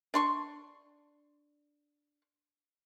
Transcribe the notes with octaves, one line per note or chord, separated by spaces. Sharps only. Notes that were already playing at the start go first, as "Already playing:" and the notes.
D4 C6 C#6